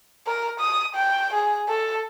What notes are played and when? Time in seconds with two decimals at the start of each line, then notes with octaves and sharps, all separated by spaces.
0.27 A#4
0.60 D#6
0.95 G5
1.34 G#4
1.68 A4